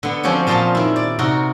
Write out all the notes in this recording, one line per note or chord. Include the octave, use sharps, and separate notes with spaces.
D3 B3
F3 C4 C#4 F#4 G4 C#5
A#2 F3 F4 D#5 F5 A5
D#3 E4
D5
C3 D#4 F#4 A#4